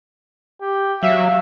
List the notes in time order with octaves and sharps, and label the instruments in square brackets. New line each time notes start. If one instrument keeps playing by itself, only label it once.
[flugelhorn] G4
[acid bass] F#3 [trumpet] E5 [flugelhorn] F5